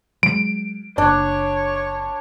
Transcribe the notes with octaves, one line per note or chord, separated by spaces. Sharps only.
F#3 G#3 D7
F#1 D4 C#5